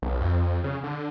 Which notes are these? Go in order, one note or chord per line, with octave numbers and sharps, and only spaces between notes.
B1
F2
C#3
D3